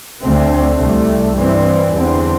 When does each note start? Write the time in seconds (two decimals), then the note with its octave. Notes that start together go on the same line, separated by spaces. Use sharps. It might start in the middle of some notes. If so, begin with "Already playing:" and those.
0.21 D2 D3 A3 C4
0.79 C2 C3 A3
1.35 G2 E3 G3 C4
1.92 E2 D3 C4